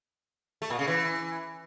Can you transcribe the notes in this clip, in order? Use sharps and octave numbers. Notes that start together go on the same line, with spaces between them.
A3
A#2
C#3
E3